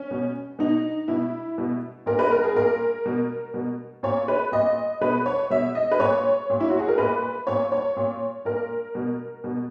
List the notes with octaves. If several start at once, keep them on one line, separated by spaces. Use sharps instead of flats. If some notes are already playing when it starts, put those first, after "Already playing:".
Already playing: C#4
B2
B2 D#4
B2 E4
B2
A#2 A#4
B4
A#4
G#4
A#2 A#4
B2
B2
A#2 C#5
B4
A#2 D#5
B2 B4
C#5
B2 E5
D#5
B4
A#2 C#5
A#2
E4
F#4
G#4
A#4
A#2 B4
A#2 C#5
C#5
A#2
A#2 A#4
B2
B2